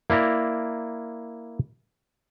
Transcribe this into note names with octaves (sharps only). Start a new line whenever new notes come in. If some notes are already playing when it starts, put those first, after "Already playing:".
A#3 E4 D5 A#5